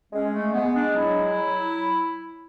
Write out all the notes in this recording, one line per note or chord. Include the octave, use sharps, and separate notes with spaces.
G#3 C#4
A3
G#3 B3
D4
F#3 E4
F#3